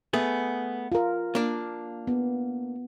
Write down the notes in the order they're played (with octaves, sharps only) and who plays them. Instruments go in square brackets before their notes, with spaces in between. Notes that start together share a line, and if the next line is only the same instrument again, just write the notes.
[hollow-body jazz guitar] A3 B3 G#4
[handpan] F4 A#4
[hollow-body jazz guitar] A#3 D4
[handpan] B3